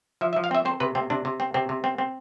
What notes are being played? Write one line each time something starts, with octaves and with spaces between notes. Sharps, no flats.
F3 E5
E5
F3
F5
C4 E5
C4 C5
C3 B4
C3 C4
C3 D4
C3
C4
C3 C4
C3
C4
C4